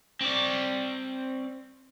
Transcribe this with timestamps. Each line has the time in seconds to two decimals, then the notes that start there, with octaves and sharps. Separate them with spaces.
0.21 C4 D5